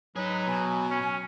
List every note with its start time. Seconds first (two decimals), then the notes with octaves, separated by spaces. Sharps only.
0.16 F#3 D#4 G#4 B4
0.47 B2 G#5
0.90 C#4